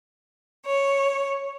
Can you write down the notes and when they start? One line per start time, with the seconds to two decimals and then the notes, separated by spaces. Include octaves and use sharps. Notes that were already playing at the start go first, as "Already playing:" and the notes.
0.65 C#5